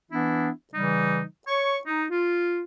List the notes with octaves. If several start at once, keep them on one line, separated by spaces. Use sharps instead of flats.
E3 B3 D4 E4
C#3 E3 G3 D#4
C#5 C#6
D#4
F4